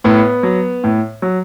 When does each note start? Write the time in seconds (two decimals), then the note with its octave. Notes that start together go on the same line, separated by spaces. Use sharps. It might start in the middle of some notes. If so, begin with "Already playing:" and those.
0.04 A2 B3
0.43 F#3
0.84 A2
1.22 F#3